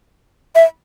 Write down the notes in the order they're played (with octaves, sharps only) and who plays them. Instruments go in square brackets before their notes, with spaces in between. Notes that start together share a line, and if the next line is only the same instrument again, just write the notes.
[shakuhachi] E5